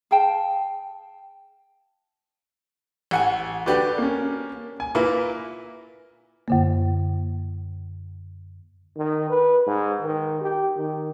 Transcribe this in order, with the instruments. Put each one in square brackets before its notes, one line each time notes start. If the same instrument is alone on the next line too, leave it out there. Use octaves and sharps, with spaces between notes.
[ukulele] G#4 F5 G5 A5
[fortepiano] A1 F#5 G#5
[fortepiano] D3 G4 [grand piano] F#4 B4 D5
[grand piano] A#3 C#4
G#5
[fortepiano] A#2 A#3 E4 [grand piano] B4
[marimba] F#2 D3 A#3
[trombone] D#3
B4
G#2
D#3
G4
D#3